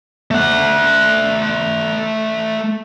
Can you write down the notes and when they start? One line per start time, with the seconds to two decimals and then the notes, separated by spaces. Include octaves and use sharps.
0.31 A3 F#5